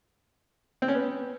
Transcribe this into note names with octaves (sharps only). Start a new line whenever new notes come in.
C4
C#4
B3